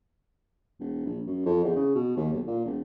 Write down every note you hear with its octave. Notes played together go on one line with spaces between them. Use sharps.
E1
A#1
F#2
F2
E2
C#3
B2
D#2
B1
A#2
E1